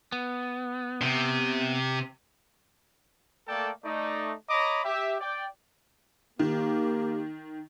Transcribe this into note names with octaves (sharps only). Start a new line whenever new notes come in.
B3
C3
A3 A#3 A4 D5 G5 A5
A3 D#4 D5
C#5 D#5 A#5 B5 D6
G4 E5
D5 G5
D#3 A#3 G4